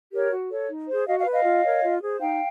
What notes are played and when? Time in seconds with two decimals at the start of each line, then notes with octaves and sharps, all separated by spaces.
0.12 G4 A#4 C#5
0.31 F#4
0.49 A4 C#5
0.68 D#4
0.87 G#4 C5
1.06 F#4 D#5 F5
1.19 D#5 F5
1.26 B4
1.31 D#5 F5
1.44 F4
1.63 A#4 C#5
1.82 F4
2.01 G#4 C5
2.20 D#4 F5 G5